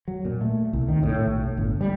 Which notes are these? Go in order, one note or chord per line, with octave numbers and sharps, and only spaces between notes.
F#3
A#2
A3
C2
D#3
A2
B1
A2
G1
G3